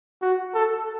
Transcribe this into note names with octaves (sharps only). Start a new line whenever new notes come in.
F#4
A4